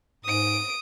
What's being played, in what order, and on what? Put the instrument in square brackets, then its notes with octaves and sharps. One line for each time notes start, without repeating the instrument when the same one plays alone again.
[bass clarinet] G#2 [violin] D#6 D7